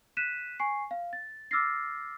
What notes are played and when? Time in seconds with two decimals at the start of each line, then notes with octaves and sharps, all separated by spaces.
0.17 F#6 B6 D#7 E7
0.59 G#5 C#6 C7
0.91 F5
1.13 A6
1.51 D6 E6 F6 A6 A#6 C7